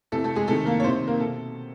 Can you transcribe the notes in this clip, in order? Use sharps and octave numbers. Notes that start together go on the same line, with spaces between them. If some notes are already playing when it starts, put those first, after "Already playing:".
C3 E3 A3 A4
A3 A4
G#3 G#4
C3 D#3 A3 A4
A#3 A#4
C#5
C3 D#3 C4 C5
A#3 A#4
B2 A4